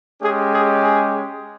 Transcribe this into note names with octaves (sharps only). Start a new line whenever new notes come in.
G#3 C#4 G4 G#4
G#4
G#4